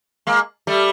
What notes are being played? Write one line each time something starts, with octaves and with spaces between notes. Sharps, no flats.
G#3 A#3
G3 A3